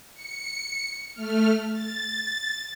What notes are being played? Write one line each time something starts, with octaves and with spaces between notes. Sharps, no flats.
C#7
A3 F6
A6